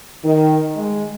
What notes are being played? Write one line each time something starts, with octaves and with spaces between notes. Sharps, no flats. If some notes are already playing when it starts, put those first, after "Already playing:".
D#3
G#3